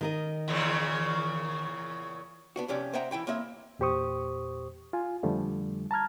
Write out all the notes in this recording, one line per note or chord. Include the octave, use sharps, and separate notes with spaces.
D#3 A#4 D#5
E2 A#2 C#3
B3 D4 F#4
F2 C3 C#4 G4 D5
C5 D#5 E5 F#5 G5 A#5
E3 E4 G5 B5
A#3 C4 C#5 D#5 E5
E2 A#2 G4 C5 C#6 D#6
F4 G#5
F2 D3 F3 G3 A3
A5 A#5 F6 G#6